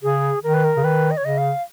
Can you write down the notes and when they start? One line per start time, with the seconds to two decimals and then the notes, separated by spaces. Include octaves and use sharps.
0.03 C#3 G#4
0.44 D#3 A#4
0.54 B4
0.64 A#4
0.77 C#3
0.84 D#3 B4
1.11 D#5
1.17 C#5
1.24 C#3 D#5
1.38 F5